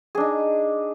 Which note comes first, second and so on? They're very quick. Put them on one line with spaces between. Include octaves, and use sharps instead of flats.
G#4 D4 D#4